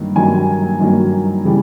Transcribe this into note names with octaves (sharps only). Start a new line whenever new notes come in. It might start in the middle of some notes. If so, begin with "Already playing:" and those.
Already playing: G2 D#3 F#3 A#3
G2 D#3 F#3 A#3 G#5
G2 D#3 F#3 A#3
C#3 E3 G3